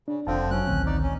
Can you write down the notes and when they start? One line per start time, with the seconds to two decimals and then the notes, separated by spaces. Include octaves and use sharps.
0.08 C#3 D4
0.27 F1 D3 F3 C4 F5 A5
0.51 F#3 C#4 F#6
0.67 A1 D2 A2 D#3 C4
0.86 D#4 D5
1.03 C#4